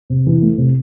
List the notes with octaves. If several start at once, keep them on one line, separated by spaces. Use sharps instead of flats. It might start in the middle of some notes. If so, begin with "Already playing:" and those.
C3
E3
A3
C3